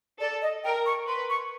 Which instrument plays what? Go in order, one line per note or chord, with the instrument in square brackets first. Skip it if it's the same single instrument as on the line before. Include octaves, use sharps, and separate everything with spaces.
[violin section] A4 [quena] D5
[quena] D#5
[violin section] A#4 [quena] G5
[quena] C#6
[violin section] B4 [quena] C6
[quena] C#6